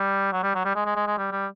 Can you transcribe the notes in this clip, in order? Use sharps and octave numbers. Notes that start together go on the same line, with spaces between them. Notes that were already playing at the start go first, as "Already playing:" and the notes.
Already playing: G3
F#3
G3
F#3
G3
G#3
G#3
G#3
G#3
G3
G3